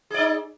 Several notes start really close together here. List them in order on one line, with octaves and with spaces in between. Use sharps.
G#4 D5 D#4